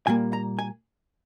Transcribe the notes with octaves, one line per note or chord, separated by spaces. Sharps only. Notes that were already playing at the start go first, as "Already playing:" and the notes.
A#2 G3 A#3 G#5
A#5
G#5